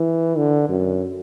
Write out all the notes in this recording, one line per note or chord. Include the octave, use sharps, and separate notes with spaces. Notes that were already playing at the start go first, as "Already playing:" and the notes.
Already playing: E3
D3
F#2